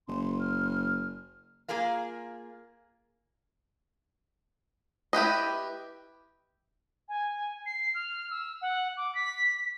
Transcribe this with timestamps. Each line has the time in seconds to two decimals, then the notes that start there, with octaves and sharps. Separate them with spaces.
0.08 F#1 C6
0.40 F6
1.68 A#3 F4 G#4 A#4 F5
5.13 E4 G4 B4 D#5
7.09 G#5
7.66 C7
7.95 F6
8.30 E6
8.62 F#5
8.97 D6
9.15 B6